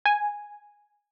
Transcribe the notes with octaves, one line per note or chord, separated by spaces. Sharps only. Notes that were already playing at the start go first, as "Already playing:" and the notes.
G#5